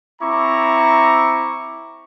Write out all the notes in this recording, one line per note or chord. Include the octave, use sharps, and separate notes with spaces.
C4 E4 A#5 C#6 D6